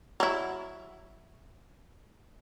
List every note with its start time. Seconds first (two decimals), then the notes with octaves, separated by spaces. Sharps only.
0.20 F#3 E4